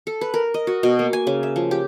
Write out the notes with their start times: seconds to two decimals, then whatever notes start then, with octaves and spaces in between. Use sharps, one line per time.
0.07 A4
0.21 B4
0.34 A#4
0.54 D#5
0.67 F#4
0.83 B2
0.99 A#3
1.13 G#5
1.27 C#3
1.43 E5
1.56 F3
1.71 G4